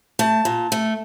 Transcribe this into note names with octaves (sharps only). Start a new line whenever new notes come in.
A3 A5
A#2
A3